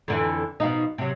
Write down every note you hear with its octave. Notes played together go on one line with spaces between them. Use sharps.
F2 D3 E3
B2 F3 D#4
C3 F#3